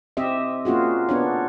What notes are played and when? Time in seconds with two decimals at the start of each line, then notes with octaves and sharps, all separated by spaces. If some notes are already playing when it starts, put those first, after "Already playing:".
0.17 C4 G4 D#5 E5
0.65 A#3 C#4 F4 F#4 G#4
1.09 B3 D4 C#5